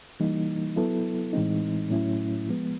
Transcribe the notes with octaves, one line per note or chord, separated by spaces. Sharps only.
E3 G3 A#3 D#4
F#3 B3 E4 A4
A2 E3 G#3 C4 D#4
A2 F#3 A3 C#4 E4
F3 G#3 B3